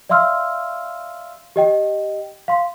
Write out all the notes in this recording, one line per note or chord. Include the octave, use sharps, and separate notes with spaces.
D5 E5 F5 C6 E6 F6
G4 D#5 G5
F5 C6